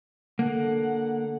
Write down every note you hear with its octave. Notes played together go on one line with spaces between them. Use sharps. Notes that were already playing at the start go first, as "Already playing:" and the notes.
D3 A#3 F#5